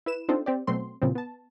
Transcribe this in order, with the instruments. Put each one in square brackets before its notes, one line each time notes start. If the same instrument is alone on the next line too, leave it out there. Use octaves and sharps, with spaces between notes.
[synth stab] E4 B4 E7
C4 D4 D#4 F4 A4 C5
C4 G4 D5
B2 F#3 A3 C4 C6
A#2 C#3 E3 F3 G3 C4
B3 A5